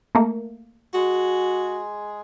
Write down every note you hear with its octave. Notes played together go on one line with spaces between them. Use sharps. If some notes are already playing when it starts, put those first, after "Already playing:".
A3 A#3
G#3 F#4 G#4